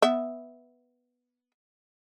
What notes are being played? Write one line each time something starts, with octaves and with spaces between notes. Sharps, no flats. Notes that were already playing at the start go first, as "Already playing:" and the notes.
B3 E5